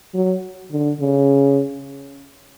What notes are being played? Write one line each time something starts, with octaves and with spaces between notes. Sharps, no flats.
F#3
D3
C#3